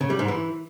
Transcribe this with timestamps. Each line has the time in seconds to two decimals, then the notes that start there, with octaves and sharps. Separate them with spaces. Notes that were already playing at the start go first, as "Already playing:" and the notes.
0.01 C#3
0.10 G3
0.19 G#2
0.28 E3